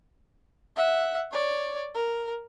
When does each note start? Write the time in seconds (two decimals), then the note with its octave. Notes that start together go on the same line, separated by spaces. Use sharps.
0.76 E5 F#5
1.31 C#5 D5
1.95 A#4